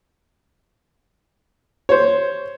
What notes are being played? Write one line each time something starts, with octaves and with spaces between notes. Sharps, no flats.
C5 C#5